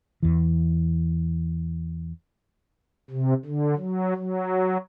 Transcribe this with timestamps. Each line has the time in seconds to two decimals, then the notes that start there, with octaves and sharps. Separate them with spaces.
0.23 E2 E3
3.11 C3
3.46 D3
3.77 F#3
4.16 F#3